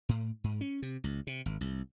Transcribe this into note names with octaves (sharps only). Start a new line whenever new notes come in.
A2
G#2
C#4
C3
C#2
C3
G#1
C2